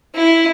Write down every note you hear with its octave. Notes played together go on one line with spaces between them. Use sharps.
E4